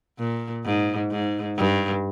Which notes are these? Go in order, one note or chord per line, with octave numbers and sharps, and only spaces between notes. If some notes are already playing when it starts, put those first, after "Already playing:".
A#2
G#2
G#2
G2